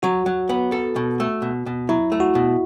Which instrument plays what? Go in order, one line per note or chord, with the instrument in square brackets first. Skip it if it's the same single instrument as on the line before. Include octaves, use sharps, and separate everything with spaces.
[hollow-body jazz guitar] F#3 [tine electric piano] F#4
[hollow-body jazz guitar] F#3
B3
A4
B2
A3
B2
B2
[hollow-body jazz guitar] F#3 [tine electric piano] E4
[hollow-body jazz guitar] A3
[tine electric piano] F#4
[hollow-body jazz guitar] B2